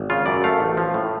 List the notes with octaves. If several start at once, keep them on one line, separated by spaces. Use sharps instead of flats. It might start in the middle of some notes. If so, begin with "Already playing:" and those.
Already playing: G#1
C#3 F4
F#2 D5
A3 F5
A1
F3
A2